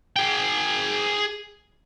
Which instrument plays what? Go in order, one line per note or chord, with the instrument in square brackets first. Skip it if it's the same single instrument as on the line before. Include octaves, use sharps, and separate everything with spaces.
[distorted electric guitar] G#4 G5